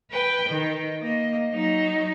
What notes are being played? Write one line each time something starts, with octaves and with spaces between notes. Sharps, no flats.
B4 G5
D#3
A#3 D#5
F#3 D#4